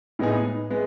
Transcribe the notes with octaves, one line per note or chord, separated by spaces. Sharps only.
A2 G#3 B3 D#4 G#4
G#3 B3